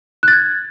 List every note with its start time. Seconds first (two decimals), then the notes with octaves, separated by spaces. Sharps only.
0.23 F#6
0.28 A6
0.33 G#6